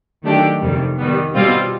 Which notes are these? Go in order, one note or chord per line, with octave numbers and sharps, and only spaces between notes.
D#3 F#3 A3 D4 G4
F2 C3 D#3 G3
D#3 G3 B3
B2 G3 C4 F4